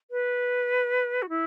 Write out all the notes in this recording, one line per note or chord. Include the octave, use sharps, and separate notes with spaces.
B4
F#4
E4